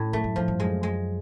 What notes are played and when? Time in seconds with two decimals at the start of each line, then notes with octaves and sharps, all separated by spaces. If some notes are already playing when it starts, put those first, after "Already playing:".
Already playing: A2 C#4
0.13 F2 A3
0.24 F#2
0.36 G2 F3
0.48 G2
0.60 F#2 G#3
0.83 G#3